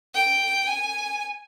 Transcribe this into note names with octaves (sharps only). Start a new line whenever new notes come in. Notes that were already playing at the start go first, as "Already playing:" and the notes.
G5
G#5